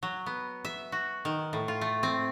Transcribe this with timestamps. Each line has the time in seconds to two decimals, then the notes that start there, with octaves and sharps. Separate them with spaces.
0.03 F#3
0.26 B3
0.65 E5
0.92 F#4
1.25 D#3
1.53 A2
1.68 F4
1.81 A3
2.03 C4